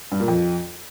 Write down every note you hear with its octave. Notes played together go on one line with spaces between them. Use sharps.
G2
A#2
F2